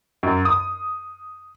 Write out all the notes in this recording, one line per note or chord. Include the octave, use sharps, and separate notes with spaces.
F#2
D#6